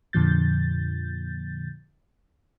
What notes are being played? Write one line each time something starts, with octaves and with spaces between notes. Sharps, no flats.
F2 A#2 D3 F3 G6 A6